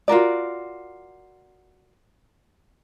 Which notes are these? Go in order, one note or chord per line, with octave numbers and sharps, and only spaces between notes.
F4 F#4 A#4 D5